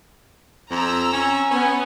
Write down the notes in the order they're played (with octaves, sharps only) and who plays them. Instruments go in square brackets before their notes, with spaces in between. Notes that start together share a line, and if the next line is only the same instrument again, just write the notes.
[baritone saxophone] F2 [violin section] A#5 E6
[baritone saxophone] C#4
[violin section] B3 [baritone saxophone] C#4